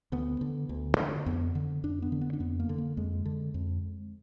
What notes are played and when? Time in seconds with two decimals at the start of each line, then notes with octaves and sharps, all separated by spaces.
0.12 D2 B3
0.41 D3
0.69 D2
0.98 D3
1.26 F2 B3
1.55 D3
1.83 F2 D4
2.02 B3
2.12 D3
2.21 B3
2.33 D4
2.40 F2 B3
2.60 A#3
2.69 D3
2.78 A#3
2.97 F2 G#3
3.25 D3
3.54 F2